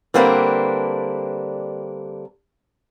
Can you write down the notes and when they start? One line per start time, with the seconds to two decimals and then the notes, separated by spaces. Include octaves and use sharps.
0.14 D3 G3 A#3 C4 D4 B4